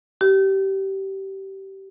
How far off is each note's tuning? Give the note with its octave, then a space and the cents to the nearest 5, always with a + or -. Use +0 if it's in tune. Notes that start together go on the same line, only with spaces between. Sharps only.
G4 -20